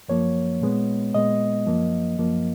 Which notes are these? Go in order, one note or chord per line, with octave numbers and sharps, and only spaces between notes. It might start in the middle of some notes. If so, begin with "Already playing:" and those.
F#2 F3 A#3 C#5
A#2 G#3 B3
A#2 G#3 B3 D#5
F#2 F3 A#3
F#2 F3 A#3